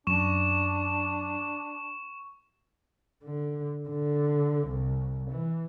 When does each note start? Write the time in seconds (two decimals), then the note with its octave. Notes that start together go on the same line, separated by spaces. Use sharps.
0.07 F#2 D4 C#6 E7
3.24 D3
3.89 D3
4.68 C2
5.31 E3